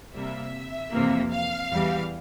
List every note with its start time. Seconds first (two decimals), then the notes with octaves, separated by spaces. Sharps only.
0.15 C3 G3 A#3 E5
0.92 F2 C3 E3 A#3
1.31 F5
1.71 E2 E3 G3